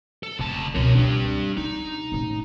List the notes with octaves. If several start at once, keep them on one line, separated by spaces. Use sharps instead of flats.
A4
F1 C#2 A5
C#2 B2 A#4 C#5
C#2 C4 D4 G4
C3 D#4
A2 C#3